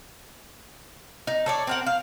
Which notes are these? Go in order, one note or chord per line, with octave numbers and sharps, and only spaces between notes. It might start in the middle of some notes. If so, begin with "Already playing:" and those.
D#4
A4 C#5 D5
C4 A#4 F#5
F5